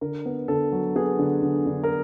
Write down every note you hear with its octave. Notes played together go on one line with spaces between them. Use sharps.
D3 A#4
B3
D3 A4
F#3
B3 G#4
D3
D3
D3
A#4